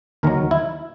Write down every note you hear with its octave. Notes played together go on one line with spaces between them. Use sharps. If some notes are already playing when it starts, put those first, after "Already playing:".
D#2 D#3 F#3 A#4
E4